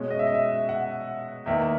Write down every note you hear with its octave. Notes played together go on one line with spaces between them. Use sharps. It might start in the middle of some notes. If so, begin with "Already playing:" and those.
Already playing: B2 G#3 C#4
D#5
E5
D#5
E5
F#5
E2 D#3 A#3 E5